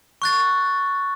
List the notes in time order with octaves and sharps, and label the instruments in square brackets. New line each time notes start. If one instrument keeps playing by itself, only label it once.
[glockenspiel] C#6 F#6 A6